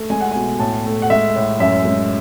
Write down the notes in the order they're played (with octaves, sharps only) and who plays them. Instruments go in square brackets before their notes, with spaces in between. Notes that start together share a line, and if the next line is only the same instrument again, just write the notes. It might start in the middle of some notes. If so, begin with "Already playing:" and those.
Already playing: [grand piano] A3
G#3 G#5
F#5
G#5
B2
A2 A5
A3
F#5
G#3 E5
A2
F#2 E5
G#3